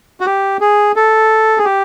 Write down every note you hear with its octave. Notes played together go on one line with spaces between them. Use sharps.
F#4
G4
G#4
A4
G#4
G4